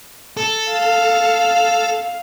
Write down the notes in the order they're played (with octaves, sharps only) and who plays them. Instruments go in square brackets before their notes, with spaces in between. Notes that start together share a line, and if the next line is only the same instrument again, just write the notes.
[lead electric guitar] A4
[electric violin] F5